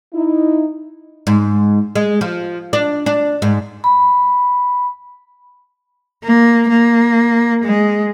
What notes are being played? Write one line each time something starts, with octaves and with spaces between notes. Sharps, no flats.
D#4 E4
G#2
G#3
F3
D4
D4
G#2
B5
A#3
A#3
G#3